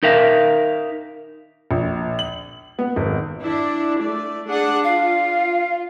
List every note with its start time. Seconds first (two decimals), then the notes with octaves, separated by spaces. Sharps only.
0.03 D#4 A#4 E5 F5
1.71 A#1
2.19 F#7
2.79 B3
2.96 G#1
3.41 D4 E4
4.00 A3 D5
4.46 D4 G#4 F#5
4.84 F4 F5